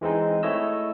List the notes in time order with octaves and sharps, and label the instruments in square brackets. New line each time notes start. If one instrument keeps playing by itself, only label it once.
[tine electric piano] E3 G#3 C4 D#4
A3 E4 C#5 D#5 E6